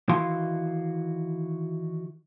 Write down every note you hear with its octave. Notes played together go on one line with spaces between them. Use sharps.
D#3 E3 E4 F#4 F5 C6